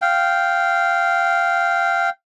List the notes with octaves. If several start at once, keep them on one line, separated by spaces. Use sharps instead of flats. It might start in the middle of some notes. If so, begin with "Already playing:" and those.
F5 G5